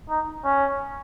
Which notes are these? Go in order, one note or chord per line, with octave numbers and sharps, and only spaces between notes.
D#4
C#4